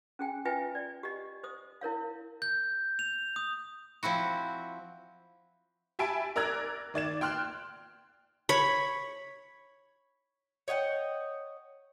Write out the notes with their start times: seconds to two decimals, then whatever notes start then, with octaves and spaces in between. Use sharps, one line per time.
0.19 C#4 G#4 G5 G#5
0.45 F4 B4 E5 G5 G#5
0.75 D5
1.03 G4 D#5
1.43 C5 D#6
1.81 E4 A#4 C#5 F5
2.42 G6
2.99 F7
3.36 D#6
4.03 F3 C4 E4 F#4
5.99 G4 E5 G#5 A5 B5 D7
6.36 A#4 D5 A#5 E6 F#6 G#6
6.94 D#3 D5 G#6 E7
7.21 G5 C6 F6 F#6
8.49 C#5 B5
10.68 C#5 D#5 F#5 G5